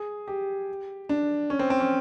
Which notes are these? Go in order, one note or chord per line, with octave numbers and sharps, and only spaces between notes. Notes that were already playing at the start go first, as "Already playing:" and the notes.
Already playing: G#4
G4
D4
C#4
C4
C4
C#4